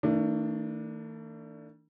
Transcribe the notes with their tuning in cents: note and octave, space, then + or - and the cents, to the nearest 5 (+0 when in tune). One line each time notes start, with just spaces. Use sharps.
D#3 +45 A3 +40 D4 +0